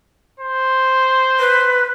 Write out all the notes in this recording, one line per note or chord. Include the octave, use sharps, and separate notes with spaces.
C5
B4